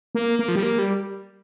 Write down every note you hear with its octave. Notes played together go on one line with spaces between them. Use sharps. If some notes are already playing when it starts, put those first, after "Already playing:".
A#3
A#3
F3
G3
A#3
G3